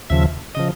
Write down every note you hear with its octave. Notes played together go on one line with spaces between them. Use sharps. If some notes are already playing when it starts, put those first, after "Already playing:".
D#2 C#3 F3 E5
C#3 F3 D#5